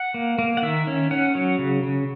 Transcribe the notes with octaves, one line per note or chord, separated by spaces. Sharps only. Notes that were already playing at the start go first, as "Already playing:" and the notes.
Already playing: F#5
A#3
A#3
F#5
D#3 E5
C#4
C#4 F#5
F#3
C#3
C#3